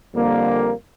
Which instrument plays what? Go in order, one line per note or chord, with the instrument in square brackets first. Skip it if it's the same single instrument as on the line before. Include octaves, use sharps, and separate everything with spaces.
[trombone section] F2 D3 G3 A#3